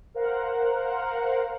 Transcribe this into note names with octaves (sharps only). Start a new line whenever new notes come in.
A#4 C5 F5 F#5